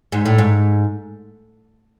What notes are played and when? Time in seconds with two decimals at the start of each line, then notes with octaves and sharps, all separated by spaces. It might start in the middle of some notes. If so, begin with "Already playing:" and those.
0.12 G#2
0.26 A2
0.38 G#2